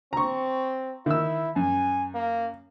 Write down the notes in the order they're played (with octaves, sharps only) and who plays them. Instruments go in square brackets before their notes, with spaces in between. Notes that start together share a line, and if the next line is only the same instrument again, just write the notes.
[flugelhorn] C4 [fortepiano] A#5 C#6
[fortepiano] D#3 E6 [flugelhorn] E4
[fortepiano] F#2 [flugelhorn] G#5
[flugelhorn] A#3